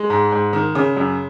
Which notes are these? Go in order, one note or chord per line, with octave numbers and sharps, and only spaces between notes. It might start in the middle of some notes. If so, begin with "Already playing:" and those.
Already playing: G#3
G#2
G#2
D#3
C#3
F#2